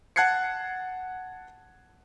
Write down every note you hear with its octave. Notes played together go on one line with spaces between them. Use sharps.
F#5 A5 F#6 G#6 C7 C#7